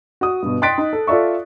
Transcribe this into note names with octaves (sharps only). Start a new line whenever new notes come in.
F#4 D#6
G2 B2
G5 C6 F#6 A6 B6 D7
D#4
A4
F4 A4 D5 E5 C#6